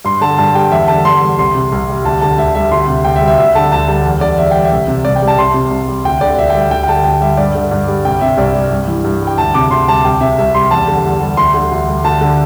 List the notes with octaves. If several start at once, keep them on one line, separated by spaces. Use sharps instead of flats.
G2 C6
D3 A5
G2 A5
G3 G5
E2 E5
D3 A5
E2 C6
G3
C2 C6
C3
C2
G3
D2 A5
D3 A5
D2 E5
G3 E5
D2 C6
C3
D2 G5
E5
G3
E5
D2 E5
D3 A5
D2 A5
G3 A5
E2
D3 D5
E2 E5
G3 G5
E5
C2
C3
C2 D5
G5
G3
A5
C2 C6
C3
C2
G3
D2 G5
D3 D5
D2 E5
G5
G3
G5
D2 G5
G5
D3 A5
D2 G5
G3 E5
G2 D5
D3
G2
G3
C2 G5
C3 E5
C2 D5
G3
G2
E3
G2
G3
G5
D2 A5
C3 D6
D2 C6
G3 A5
C2 G5
C3 E5
C2 E5
G3 C6
E2 A5
D3
E2
G3
D2 C6
D3
D2
G3
D2 A5
D3